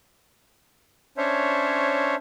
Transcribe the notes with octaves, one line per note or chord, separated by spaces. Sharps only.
C#4 D4 C5 C#5 E5